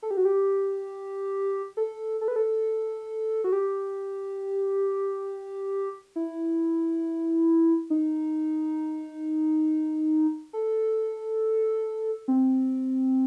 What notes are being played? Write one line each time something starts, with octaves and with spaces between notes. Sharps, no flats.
A4
G4
F#4
G4
A4
A4
B4
A4
F#4
G4
E4
D#4
A4
C4